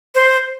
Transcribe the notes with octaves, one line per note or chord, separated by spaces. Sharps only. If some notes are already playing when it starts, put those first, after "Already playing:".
C5